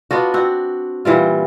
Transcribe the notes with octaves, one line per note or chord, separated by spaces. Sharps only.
B3 D4 F4 F#4
C4 F#4
A#2 E3 G3 F4